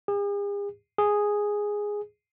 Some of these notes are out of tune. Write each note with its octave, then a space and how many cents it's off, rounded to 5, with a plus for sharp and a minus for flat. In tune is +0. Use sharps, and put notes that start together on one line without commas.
G#4 -45
G#4 -5